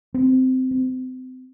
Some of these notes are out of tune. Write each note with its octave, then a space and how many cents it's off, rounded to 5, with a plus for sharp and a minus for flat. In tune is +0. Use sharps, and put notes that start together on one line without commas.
C4 -15
C4 -35